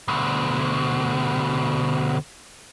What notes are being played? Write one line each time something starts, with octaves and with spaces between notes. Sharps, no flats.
D2 B2